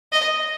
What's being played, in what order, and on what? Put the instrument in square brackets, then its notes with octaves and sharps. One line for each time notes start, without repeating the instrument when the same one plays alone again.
[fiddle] D#5